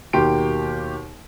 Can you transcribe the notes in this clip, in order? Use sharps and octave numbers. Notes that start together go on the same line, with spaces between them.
D#2 B2 A#3 G4 C6 D7